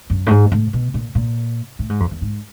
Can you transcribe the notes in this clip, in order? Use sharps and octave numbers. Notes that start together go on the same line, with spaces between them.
F#2
A2
G#2
A2
B2
A#2
A#2
A2
G#2
F2
E2
G#2